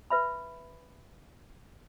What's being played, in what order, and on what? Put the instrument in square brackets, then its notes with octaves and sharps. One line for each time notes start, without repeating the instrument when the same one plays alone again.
[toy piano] B4 E5 B5